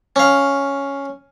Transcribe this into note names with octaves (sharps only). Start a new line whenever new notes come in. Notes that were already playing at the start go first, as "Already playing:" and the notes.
C#4 F5